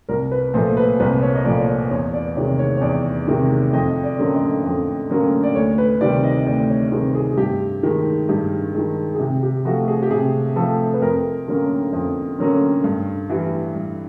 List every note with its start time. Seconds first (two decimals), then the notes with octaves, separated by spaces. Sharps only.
0.09 C2 A#4
0.31 B4
0.54 A#2 F3 A3 C5
0.77 B4
1.00 C2 B4
1.22 C#5
1.35 D#5
1.45 A#2 F3 A3 D5
1.60 C#5
1.68 D5
1.91 E2 C#5
2.14 D5
2.36 C3 D#3 G#3 C#5
2.59 C#5
2.77 C#5
2.81 E2 D5
3.27 C3 D#3 G#3
3.73 F2 D#5
4.04 D5
4.19 D3 F#3 A#3 C#4
4.34 D#5
4.64 F2
5.10 D3 F#3 A#3 C#4
5.43 D5
5.55 D2 C#5
5.78 B4
6.01 C3 D#3 G3 C4 D5
6.24 D#5
6.46 D2 D5
6.70 C#5
6.92 C3 D#3 G3 C4 G#4
7.15 G#4
7.31 G#4
7.37 G2 G4
7.83 D#3 G#3
8.29 G2 G4
8.74 D#3 G#3
9.15 G#4
9.19 C3 G4
9.43 G4
9.65 F3 A3 F#4
9.88 G#4
10.03 G4
10.11 C3 G#4
10.56 F3 A3 A4
10.94 B4
11.02 F2 A#4
11.47 D3 F#3 A#3 C#4
11.93 F2
12.38 D3 F#3 A#3 C#4
12.84 G2
13.30 E3 G3
13.75 G2